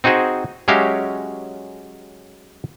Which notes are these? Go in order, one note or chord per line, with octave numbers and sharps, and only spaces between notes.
C4 D#4 F#4 G#4 C5
F#3 G#3 C#4 G4 E5 F5